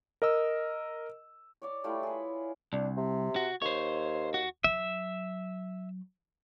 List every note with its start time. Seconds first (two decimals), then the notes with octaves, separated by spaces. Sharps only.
0.22 A#4 D#5 E6
1.62 C#5 D5 D6
1.84 G3 A3 E4 F4
2.03 G#4 B4
2.73 C2 D4
2.97 C3
3.36 F#4
3.62 D#2 C5 C#5
4.34 F#4
4.64 F#3 E5